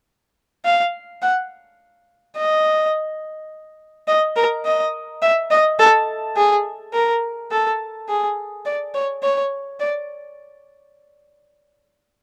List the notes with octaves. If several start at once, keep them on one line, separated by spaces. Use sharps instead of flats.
F5
F#5
D#5
D#5
A#4
D#5
E5
D#5
A4
G#4
A#4
A4
G#4
D5
C#5
C#5
D5